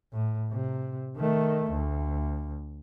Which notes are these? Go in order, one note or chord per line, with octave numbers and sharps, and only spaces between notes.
A2
C3
D#3 A3
D2